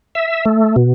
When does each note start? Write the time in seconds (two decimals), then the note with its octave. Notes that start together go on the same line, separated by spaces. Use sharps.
0.15 E5
0.45 A3
0.76 B2